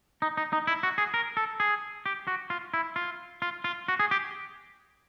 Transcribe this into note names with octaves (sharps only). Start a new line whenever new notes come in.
D#4
D#4
D#4
E4
F#4
G#4
A#4
A4
G#4
G4
F#4
F4
E4
F4
F4
F4
F#4
G#4
G4